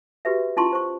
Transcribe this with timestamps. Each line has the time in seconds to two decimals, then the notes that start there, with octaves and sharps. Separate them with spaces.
0.25 F#4 G4 B4 E5
0.57 C#4 E4 F4 A5 C6 C#6
0.73 C5 C#6